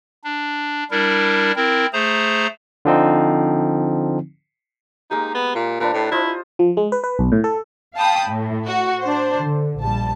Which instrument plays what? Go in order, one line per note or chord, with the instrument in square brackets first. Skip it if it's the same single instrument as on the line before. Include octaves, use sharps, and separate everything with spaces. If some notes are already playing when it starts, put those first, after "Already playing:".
[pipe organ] D4
G3 D4 E4 A#4
C4 E4 A#4
A3 G#4 C5 A#5
[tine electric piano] D3 F3 C4 D#4
[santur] G#3 A#3 G4 [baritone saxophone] D#4
[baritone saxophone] B3
A#2
[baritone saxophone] A#2 [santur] D4 B4 A#5
[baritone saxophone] A2
[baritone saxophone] E4 [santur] F4 C5 D#5
[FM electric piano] F3
G#3
B4
B4
B1
A2
A4
[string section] F5 G5 A5 B5 D#6
A2
F#4
D4 C5
D3
A#1 G3 A5